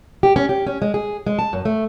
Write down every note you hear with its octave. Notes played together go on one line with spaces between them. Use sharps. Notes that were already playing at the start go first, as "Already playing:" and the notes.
G4
C#4
G4
C#4
G#3
G#4
G#3
A5
F#2
A3